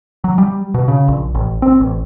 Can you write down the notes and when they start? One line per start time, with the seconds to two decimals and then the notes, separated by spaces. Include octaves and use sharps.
0.24 F#3
0.38 G3
0.74 B2
0.88 C#3
1.08 A#1
1.35 A1
1.62 C4
1.80 A1